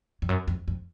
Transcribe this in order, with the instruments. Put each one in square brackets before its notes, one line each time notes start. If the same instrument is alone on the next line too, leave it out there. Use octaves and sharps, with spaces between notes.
[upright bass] F2
F#2
F2
F2